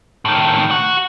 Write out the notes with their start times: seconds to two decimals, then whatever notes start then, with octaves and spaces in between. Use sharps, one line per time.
0.25 A2 D#3
0.71 F#4